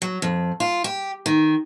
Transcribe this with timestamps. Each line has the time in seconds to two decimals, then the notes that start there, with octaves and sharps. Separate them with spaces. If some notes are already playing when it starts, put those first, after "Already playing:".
0.02 F#3
0.22 F2
0.60 F4
0.84 G4
1.26 D#3